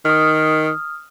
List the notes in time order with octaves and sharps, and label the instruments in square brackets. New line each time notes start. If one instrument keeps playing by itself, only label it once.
[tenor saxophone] D#3 [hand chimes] D#6 F6